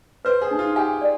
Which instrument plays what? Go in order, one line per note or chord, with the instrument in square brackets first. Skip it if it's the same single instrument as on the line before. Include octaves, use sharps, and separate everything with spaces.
[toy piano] B4 [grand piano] C5
[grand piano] G#4
[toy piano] D#4
[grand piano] F4
[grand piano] G4 [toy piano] G#5
[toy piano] D5